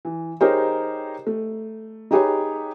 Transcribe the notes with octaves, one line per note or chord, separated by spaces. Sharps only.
E3
D#4 G4 G#4 A#4 C5 C#5
A3
D#4 G4 G#4 B4 C#5